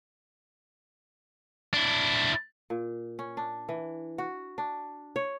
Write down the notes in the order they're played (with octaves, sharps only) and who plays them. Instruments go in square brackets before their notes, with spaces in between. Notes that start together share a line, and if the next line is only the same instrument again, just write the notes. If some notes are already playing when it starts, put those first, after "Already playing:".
[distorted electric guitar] D4 E4
[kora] A#2
C#4
D4
E3
F#4
D4
C#5